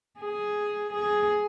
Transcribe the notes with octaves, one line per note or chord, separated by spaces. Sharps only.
G#4
G#4